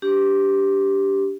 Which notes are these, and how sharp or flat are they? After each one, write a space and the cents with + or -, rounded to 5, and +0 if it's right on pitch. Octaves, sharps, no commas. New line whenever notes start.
D4 -35 G4 +0